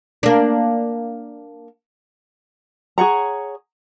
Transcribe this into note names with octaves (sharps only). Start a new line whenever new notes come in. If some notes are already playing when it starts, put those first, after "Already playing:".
A#3 D4
G#4 C#5 F#5 A#5